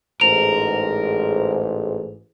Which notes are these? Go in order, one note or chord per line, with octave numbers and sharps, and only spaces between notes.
A1 G#2 A#4 F7